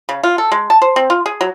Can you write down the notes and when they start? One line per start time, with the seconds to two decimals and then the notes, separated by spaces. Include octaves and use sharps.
0.09 C#3
0.23 F4
0.38 A4
0.52 G#3
0.70 A5
0.82 C5
0.96 C4
1.10 F4
1.26 G#4
1.41 F#3